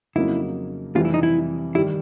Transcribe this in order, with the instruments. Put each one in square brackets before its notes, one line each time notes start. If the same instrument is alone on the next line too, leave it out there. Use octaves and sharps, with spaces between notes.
[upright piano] F2 C#3 F#3 A#3 D#4 [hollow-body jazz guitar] E4
[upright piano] F2 C3 E3 G3 [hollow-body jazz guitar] F4
[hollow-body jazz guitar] E4
D#4
E4
[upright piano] D#3 G3 [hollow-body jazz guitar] E4